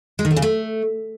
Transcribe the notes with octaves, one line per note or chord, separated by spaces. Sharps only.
G#3
D#3
A3
C#3
A3